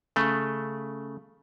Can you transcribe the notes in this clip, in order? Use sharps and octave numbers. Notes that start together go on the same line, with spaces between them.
C#3 A3